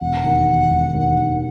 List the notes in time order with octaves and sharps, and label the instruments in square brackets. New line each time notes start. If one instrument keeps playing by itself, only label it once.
[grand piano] E1 [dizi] F#5
[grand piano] D#2
E1
E1
D#2
D#2